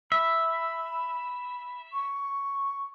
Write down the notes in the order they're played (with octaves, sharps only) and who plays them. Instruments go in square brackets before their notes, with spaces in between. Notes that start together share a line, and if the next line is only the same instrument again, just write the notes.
[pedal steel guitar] E5 [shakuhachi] B5
[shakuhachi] C#6